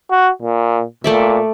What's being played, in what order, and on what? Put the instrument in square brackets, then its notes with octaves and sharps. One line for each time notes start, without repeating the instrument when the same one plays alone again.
[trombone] F#4
A#2
[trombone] A#2 [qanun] A3 D5 E5